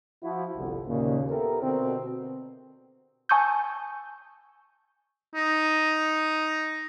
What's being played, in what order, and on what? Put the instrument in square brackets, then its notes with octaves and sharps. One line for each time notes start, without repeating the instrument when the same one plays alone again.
[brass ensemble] F3 E4 F#4
G1 C2
D#2 A#2 C#3
B3 E4 G4 A4 A#4
B2 D3 C4
[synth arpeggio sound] G#5 A5 C#6 D#6 E6 G6
[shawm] D#4